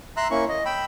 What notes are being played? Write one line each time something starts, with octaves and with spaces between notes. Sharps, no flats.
E5 A#5 C6 E6 F#6
A#3 C#4 E4 C#6
D#5
G5 B5 E6